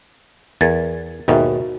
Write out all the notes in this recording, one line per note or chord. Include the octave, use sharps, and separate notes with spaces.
E2 A#4 G#6 A6
D#2 G#2 B2 F#4 A#4 E5